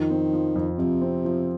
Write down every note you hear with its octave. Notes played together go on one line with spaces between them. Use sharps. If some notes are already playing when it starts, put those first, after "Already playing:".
Already playing: F2 D#3
C4
F3
F2
F2 C3
C4
F3